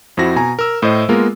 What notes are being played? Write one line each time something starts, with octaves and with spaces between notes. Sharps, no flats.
F2 C4 E4 F#4 A#6
B2 G#5 A#5
A#4 E6
A2 C5 D#5
G#3 A#3 B3 F4 A#4